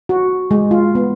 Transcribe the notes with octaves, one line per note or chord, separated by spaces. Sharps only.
F#4
G#3
F4
B3